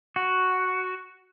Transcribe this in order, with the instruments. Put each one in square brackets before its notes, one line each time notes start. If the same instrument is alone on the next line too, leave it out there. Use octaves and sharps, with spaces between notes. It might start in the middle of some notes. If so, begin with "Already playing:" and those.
[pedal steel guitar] F#4